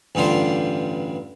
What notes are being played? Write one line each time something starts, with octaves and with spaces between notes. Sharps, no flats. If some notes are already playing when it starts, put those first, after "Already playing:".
A1 G2 D3 F4 C5